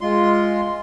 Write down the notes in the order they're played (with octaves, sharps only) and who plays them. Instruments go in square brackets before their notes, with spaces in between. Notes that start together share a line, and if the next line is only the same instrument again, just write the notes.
[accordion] G#3 F4 C6